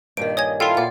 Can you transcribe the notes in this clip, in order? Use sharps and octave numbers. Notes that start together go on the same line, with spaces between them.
G2 A#2 D#3 D7
C#5 D#5 G#5 G#6
E4 F4 A4 G5 C6
A#2 D5 F#5